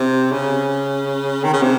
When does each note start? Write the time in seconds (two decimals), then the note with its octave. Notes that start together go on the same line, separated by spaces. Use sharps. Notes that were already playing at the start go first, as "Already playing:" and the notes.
Already playing: C3
0.32 C#3
1.44 D#3
1.53 C#3
1.63 C3